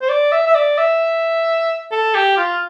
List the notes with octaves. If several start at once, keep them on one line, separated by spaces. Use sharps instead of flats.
C5
D5
E5
E5
D5
E5
A4
G4
F4